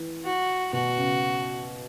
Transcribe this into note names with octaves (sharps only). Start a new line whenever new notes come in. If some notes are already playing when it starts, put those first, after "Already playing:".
Already playing: E3
F#4
B2 F#4
C#3